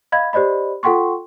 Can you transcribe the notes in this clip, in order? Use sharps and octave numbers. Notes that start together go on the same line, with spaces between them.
D#5 F5 B5 G#6
G4 C5 D5 D#5 B5
F4 A4 F#5 G5 C6 C#6